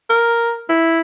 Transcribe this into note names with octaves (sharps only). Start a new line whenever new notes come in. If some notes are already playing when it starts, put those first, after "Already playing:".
A#4
E4